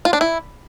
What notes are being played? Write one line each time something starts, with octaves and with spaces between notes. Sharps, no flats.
F4
D4
E4